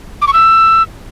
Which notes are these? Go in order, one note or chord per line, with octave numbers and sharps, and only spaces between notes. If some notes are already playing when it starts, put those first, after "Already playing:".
D6
C#6
E6